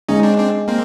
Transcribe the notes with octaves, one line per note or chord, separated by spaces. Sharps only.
G#3 C#4 D#4
C4 D4
C4 D4
A#3 C4